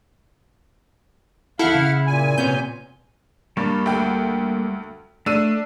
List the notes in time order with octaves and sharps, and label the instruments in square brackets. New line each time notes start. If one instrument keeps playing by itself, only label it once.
[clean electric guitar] E2 A4 [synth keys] E4 [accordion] F5 F#5 F6
[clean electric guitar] C#3
[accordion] A#2 G#5
[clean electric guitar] C3 B3 C#4 [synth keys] G6
[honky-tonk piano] G2 [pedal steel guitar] G3 A#3 A5
[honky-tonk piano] D2 G5
[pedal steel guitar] A3 [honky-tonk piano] D4 E6 D#7